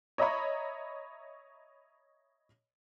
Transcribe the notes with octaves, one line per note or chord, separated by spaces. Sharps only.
C#5 D#5 E5 A#5 B5 C#6